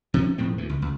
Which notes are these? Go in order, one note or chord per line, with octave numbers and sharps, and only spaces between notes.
C3 F3 C4 C#4
E1 A2 F3 C4
D2 E3
C#2
C#2